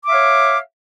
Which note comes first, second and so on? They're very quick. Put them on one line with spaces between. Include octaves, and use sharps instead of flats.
D6 E5 F5 C#5